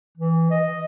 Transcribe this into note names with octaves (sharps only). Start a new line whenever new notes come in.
E3
D#5